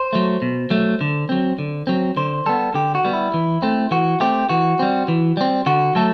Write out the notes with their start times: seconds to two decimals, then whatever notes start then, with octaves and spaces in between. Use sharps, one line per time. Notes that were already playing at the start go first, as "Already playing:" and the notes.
Already playing: C5
0.13 F#3 A3
0.42 B2
0.70 F#3 A3
1.01 D3
1.29 F#3 C4
1.59 D3
1.87 F#3 C4
2.17 D3 C5
2.46 G3 B3 A4
2.74 D3 G4
2.95 F#4
3.05 G3 B3
3.13 E4
3.34 E3
3.62 A3 C4
3.91 E3 F#4
4.20 A3 C4 G4
4.49 E3 F#4
4.79 G3 C4
5.08 E3
5.37 G3 C4
5.66 D3 F#4
5.95 F#3 A3 A4